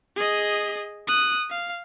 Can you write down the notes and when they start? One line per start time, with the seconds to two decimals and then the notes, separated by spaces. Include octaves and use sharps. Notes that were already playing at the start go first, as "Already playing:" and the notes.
0.17 G#4 D#5
1.08 D#6 F#6
1.50 F5